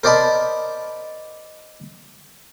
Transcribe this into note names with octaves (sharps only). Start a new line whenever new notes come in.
A#4 C5 D5 D#5 A5 B5